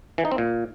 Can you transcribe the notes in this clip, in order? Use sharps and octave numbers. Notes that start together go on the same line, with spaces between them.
E3
D#4
C4
A#2